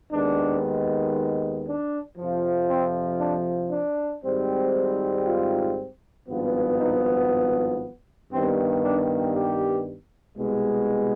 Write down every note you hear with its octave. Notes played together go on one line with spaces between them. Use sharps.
D#2 D#3 G#3 B3 D4
D4
F2 C3 F3
C4
D4
D4
G#1 G#2 G3 C4
F4
G#1 G2 F3 B3
D#4
G2 D#3 G3 B3 C4
D4
G4
C2 B2 G#3